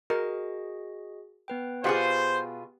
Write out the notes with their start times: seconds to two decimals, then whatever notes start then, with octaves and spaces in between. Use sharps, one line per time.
0.10 F#4 G#4 A#4 D#5
1.48 B3 B4 G5
1.84 B2 F4 G4 G#4 C5 F5 F#5